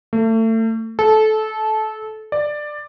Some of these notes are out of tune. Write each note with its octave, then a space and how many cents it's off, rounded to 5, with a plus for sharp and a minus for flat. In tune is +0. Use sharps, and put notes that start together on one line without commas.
A3 +30
A4 -20
D5 +15